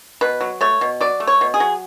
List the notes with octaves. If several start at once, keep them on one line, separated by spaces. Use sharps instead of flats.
B2 B4
F#3
A3 C#5
B2
F#3 D5
A3
C#5
B2
G#4
F#3